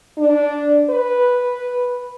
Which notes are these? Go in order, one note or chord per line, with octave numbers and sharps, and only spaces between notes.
D4
B4